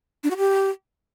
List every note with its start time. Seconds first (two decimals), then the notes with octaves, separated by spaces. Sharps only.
0.24 D4
0.30 F#4
0.37 G4